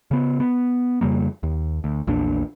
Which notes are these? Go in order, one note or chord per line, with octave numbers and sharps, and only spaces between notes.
C#3 B3
B3
F2 C#3 G3 A#3
D#2
D2
A#1 E2 A#2 D4